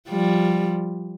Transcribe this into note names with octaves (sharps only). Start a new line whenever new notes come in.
F3 G3